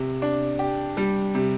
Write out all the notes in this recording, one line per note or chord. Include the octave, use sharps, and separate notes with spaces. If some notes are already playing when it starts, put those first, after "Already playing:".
Already playing: C3
D4
G4
G3
C3